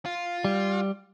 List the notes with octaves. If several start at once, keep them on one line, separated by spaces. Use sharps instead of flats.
F4
G3